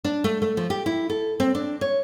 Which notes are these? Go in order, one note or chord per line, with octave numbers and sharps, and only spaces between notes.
D4
A3
A3
F3
G4
E4
A4
C4
D4
C#5